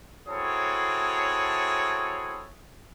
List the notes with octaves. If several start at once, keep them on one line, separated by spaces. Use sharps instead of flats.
C4 E4 F#4 G#4 A4 C#5